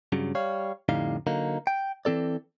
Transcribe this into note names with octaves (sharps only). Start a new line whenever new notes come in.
G2 C#3 F#3
G3 C#5 F5
F2 A2 D3 G3 D#4 F5
D3 F#3 A#3 D#4
G5
E3 C4 A4 D5